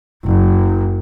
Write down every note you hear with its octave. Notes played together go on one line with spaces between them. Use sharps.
F#1